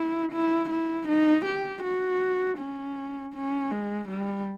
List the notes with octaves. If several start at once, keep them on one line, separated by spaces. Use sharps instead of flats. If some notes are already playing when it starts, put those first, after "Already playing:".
Already playing: E4
E4
E4
D#4
G4
F#4
C#4
C#4
G#3
G3